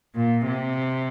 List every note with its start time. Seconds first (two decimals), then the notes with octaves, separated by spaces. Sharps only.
0.15 A#2
0.46 C3